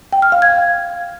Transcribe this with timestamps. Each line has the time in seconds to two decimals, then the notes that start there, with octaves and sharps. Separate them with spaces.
0.13 G5
0.22 F6
0.32 F5
0.42 G#6